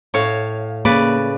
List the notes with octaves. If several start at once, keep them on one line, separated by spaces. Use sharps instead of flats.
A2 C#5 F5
C#3 A#3 B4 D5